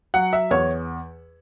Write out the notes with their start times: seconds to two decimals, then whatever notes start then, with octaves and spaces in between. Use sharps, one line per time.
0.14 F#3 F#5
0.33 E5
0.51 E2 C#5